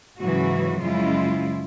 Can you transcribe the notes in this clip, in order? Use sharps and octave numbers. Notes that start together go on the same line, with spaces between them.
G#2 C#3 E3 F#3 F#4
F#2 C#3 F3 G#3 E4 F4